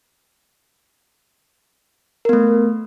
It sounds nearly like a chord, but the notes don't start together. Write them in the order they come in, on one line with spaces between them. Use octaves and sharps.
A#4 B3 A3